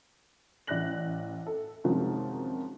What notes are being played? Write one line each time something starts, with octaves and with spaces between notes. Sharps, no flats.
A1 D5 E5 F#6 A#6 F#7
A4
F#2 C3 D#3 F3 G#3